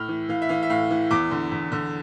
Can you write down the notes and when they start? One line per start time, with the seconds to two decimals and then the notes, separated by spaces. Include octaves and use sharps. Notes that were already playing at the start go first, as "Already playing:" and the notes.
Already playing: A2 F6
0.08 E3
0.29 E3 F5
0.42 E5
0.49 E3 F5
0.63 E5
0.70 A2 F5
0.90 E3
1.11 E2 D6
1.31 D3
1.52 E2
1.72 D3